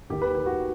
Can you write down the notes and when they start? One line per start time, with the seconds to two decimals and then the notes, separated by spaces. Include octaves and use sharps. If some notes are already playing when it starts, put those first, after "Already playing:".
0.10 D#2 D#3 G4
0.22 B4
0.35 G4
0.46 F#4